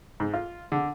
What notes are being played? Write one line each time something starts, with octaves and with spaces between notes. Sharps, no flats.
G#2
F4
D3